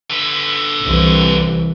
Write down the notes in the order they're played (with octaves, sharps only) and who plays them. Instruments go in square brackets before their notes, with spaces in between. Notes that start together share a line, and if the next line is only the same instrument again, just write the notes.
[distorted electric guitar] D3 B4
[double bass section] C2 E3